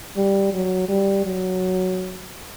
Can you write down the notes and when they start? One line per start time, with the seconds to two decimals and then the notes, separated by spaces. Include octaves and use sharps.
0.16 G3
0.53 F#3
0.89 G3
1.25 F#3